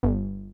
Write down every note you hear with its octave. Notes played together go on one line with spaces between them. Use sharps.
G1